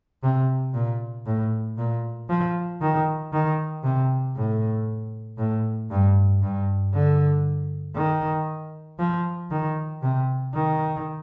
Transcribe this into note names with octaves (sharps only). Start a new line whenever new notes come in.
C3
A#2
A2
A#2
F3
D#3
D#3
C3
A2
A2
G2
G2
D3
D#3
F3
D#3
C3
D#3